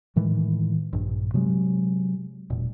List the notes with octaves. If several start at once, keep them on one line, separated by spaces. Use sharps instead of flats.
A2 D#3 E3 G#3
A#1 G2
C3 F#3 G#3
E1 A#2